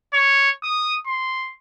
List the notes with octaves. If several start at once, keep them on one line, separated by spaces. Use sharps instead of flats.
C#5
D#6
C6